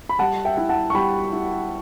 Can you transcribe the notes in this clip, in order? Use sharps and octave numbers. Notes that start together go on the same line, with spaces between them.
B5
G3 F#5 A5
E5 G5
E4
F#5 A5
C#6
G3 G5 B5
E4